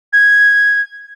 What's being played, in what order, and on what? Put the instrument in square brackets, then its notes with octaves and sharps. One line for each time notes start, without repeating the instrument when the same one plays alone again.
[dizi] G#6